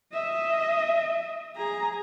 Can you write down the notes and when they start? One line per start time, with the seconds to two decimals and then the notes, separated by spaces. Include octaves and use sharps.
0.13 D#5 E5
1.56 G#4 A#5